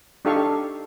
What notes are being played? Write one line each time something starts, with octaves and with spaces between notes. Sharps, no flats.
D4 D#4 G4 A4 F5 C#6